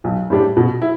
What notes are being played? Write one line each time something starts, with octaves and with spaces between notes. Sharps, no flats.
B1
A2 G3 D4 G4
B2
E4